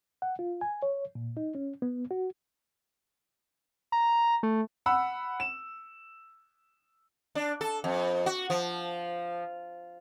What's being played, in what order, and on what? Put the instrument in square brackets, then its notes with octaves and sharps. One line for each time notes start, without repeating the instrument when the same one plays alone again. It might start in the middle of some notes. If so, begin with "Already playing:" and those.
[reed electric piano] F#5
F4
G#5
C#5
A#2
D#4
C#4
B3
F#4
[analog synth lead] A#5
A3
[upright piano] F#5 B5 E6
E7
[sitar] D4
A4
F2
F#4
F3